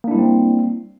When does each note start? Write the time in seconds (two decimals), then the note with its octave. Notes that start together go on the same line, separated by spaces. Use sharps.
0.04 A#3
0.08 D4
0.11 E4
0.15 G3
0.18 C4